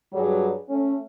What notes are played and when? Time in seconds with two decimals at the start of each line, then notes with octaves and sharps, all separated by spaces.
0.12 G2 F#3 G3 G#4
0.69 A3 C#4